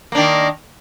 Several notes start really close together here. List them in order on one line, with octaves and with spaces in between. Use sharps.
A#3 D4 D#3